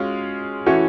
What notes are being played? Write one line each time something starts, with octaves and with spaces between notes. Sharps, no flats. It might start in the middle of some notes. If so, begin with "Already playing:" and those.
Already playing: G#3 C#4 F4 F#4
E3 A3 C#4 E4 F#4